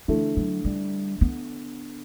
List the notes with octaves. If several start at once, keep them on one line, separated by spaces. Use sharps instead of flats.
D3 E3 A3 E4
F#3
G3
B3